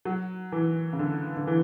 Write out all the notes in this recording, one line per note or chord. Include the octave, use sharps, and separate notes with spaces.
F#3
E3
C#3
D3
D3
E3